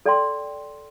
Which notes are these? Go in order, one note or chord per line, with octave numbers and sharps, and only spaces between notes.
A4 D5 G5 C6